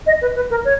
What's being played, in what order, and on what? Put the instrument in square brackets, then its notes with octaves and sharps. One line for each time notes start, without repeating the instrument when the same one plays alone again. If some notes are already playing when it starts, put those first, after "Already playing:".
[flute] D#5
B4
B4
A#4
C#5